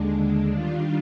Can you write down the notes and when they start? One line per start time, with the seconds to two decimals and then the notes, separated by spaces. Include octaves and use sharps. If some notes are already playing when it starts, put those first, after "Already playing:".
Already playing: D#2 D3 G#3 D4
0.51 D#3 G3 D4 F4